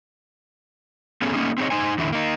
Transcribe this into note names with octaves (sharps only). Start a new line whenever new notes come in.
A3 B3 C#4 G#4 A4
A3 A#3 C#4 D#4 G#4
C4 D#4 G#4 C#5 D#5
D#4 C5 G#5
E2 D3 D#3 E4
A#3 D#4